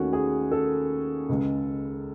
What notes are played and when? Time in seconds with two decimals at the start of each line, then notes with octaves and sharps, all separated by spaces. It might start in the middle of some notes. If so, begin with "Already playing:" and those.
Already playing: D#2 D#3 A3 C#4 F#4
0.13 G#4
0.51 A4
1.29 C#2 C#3 G#3